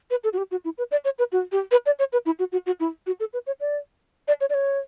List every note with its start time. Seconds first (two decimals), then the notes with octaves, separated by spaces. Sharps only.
0.10 B4
0.24 A4
0.33 F#4
0.38 G4
0.51 F#4
0.65 E4
0.78 B4
0.91 D5
1.05 C#5
1.19 B4
1.32 F#4
1.52 G4
1.71 B4
1.86 D5
1.99 C#5
2.12 B4
2.26 E4
2.39 F#4
2.52 F#4
2.66 F#4
2.80 E4
3.07 F#4
3.20 A4
3.33 B4
3.47 C#5
3.60 D5
4.28 D5
4.41 C#5
4.50 D5
4.54 C#5